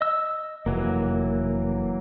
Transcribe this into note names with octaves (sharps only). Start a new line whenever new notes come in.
D#5 E6
F1 E3 F#3 A#3